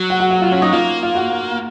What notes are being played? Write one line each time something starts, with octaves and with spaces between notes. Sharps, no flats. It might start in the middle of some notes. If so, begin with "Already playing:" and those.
Already playing: F#3
F#4
F#4
F#4
F4
C#4
D#4
A#3 F4
F4
F#4